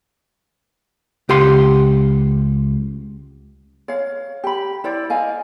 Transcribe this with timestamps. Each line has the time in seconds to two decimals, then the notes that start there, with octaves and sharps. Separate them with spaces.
1.29 C#2 G4 F#5 C6
3.88 C#5 F5
4.44 G4 B5
4.84 E4 C5 D5
5.10 D#5 F5 G#5